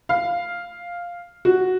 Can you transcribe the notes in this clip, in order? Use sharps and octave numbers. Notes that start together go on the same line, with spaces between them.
F5
F#4